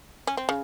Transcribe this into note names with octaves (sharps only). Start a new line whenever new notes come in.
C#4
C4
C#3